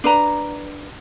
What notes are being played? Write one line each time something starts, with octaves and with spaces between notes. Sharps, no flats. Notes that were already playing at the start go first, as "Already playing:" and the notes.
D4 B4 A#5